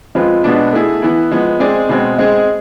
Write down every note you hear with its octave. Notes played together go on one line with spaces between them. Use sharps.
F3 G#3 C4 F4 B4
B2 G#3 B3 D4
A3 E4 G#4
E3 B3 E4
F3 G#3 B3
G#3 C4 G#4 D5
B2 G#3 C4
G#3 C4 G#4